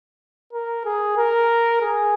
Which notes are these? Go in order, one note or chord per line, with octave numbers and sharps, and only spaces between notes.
A#4
G#4
A#4
G#4